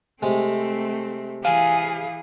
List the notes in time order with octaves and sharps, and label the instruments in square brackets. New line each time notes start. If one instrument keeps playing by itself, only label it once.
[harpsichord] C3 G#3 [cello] A3 C4
[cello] E3 G#4 [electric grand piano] F5 [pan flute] G#5